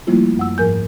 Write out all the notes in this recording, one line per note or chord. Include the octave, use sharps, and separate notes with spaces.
F3 G3 A3 A#3 E4 F4
F#2 F#5 E6
G#2 F3 A#4 G#5 G6